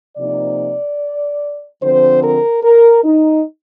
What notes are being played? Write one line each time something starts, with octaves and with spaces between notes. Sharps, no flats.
C3 F3 A#3 D#4 D5
D3 F3 C4 C5
A#4
A#4
D#4